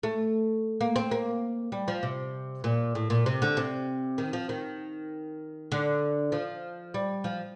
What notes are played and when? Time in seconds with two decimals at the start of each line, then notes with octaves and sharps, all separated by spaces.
0.03 A3
0.81 A#3
0.96 C4
1.11 A#3
1.72 G3
1.88 F3
2.03 C3
2.64 A#2
2.95 A2
3.10 A#2
3.26 C3
3.42 D3
3.57 C3
4.18 D#3
4.33 F3
4.49 D#3
5.72 D3
6.32 F3
6.94 G3
7.24 F3